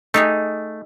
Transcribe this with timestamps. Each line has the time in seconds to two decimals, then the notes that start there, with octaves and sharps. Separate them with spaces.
0.14 A3 D#4 G4 G#4